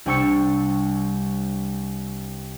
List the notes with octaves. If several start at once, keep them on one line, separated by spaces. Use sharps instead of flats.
C2 D4 G5 C#6 E6 C#7